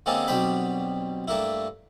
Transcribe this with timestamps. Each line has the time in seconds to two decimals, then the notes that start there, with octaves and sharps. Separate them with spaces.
0.06 D3 G#3 A#3 C4 C#4 A4
0.28 B1 B2 G3 C4 G5 B5
1.28 G2 A3 A#3 E4